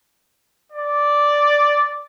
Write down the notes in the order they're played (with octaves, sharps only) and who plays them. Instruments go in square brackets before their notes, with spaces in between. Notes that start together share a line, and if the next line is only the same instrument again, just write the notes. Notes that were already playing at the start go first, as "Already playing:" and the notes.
[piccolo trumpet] D5